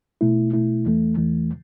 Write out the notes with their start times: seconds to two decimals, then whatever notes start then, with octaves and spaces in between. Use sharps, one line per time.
0.21 B2 A3 E4
0.53 B2 A3 E4
0.86 E2 E3 A3
1.17 E2 E3 A3